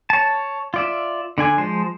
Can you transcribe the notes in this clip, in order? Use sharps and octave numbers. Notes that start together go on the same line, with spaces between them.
C#5 A5
F4 D5 E5
D3 D4 G#5
F3 G#3 C5